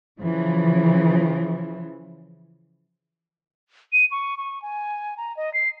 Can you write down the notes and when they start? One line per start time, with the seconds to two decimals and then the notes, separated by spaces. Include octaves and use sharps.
0.21 C#3 E3 F3
3.93 D#7
4.11 C#6
4.38 C#6
4.62 G#5
5.17 A#5
5.37 D#5
5.54 C7